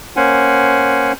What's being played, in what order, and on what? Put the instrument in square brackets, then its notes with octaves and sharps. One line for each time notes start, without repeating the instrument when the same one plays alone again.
[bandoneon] A#3 C#4 C5 F#5 G#5